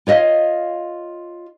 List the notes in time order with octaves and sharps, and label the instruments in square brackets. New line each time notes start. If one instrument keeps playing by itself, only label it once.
[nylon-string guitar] F4 C#5 D#5 F5